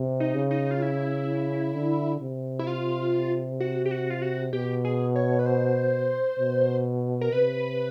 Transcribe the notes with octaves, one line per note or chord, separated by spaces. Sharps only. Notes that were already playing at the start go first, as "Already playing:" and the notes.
Already playing: C3
D#4
C#3
D#4
F4
E4
D3
C3
E4
F4
F#4
G4
F#4
F4
F#4
B2 G4
G#4
C#5
B4
C5
B2
A#4
C3 B4